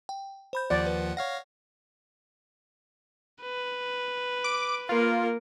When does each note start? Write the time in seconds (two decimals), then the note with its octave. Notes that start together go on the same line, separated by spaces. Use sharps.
0.09 G5
0.53 C5 B5 G6
0.70 D#2 F3 D5 F#5
0.86 B4
1.17 C#5 F5 F#5 A#6
3.42 B4
4.44 D6
4.89 A#3 F4 A#4